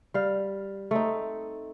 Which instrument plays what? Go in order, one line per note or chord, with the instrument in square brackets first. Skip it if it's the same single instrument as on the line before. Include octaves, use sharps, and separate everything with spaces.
[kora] G3 F5
A3 C4 D#4